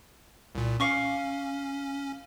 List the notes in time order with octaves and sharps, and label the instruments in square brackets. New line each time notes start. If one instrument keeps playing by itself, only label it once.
[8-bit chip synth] C2 A#2
[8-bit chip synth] C#4 [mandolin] F5 C#6 D6